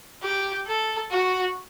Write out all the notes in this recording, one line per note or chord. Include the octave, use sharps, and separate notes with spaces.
G4
A4
F#4